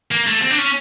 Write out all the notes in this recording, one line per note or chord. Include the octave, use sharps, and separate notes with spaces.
A#3
A3
C4
D4
C#4